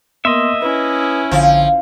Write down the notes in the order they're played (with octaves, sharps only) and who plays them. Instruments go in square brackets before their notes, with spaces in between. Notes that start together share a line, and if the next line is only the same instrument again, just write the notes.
[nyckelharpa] A#3 [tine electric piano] B3 C6 [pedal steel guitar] D#5 E5
[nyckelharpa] C#4 E4 [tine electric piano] B4
[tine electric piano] A#1 D3 [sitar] F3